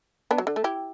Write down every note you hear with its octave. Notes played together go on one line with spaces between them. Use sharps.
B3 D4
F#3
D3
A3
E4 G4